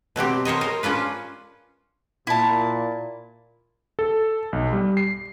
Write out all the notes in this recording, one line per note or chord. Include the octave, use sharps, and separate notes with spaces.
B2 F#3 C4 G4
A#4 C5 C#5 D#5
A#4 C5
C#4 D4 F4 B4
A#2 E4 A5
A4
B1
G3
C7